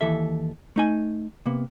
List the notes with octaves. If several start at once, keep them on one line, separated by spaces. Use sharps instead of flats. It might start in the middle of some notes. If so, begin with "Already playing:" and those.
D#2 E3 A4 E5
A3 D#4 G#5
C3 A#3 B3